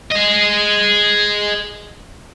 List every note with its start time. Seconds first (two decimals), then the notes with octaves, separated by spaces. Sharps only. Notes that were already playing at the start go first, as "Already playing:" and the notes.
0.12 G#4 D#5